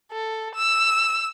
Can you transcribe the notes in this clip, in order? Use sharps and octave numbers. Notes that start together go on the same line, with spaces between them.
A4
E6